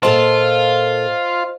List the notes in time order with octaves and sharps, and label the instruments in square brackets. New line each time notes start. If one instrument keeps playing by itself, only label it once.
[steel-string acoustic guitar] A#2 A4 A5 [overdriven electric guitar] F4 [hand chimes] C5 D#5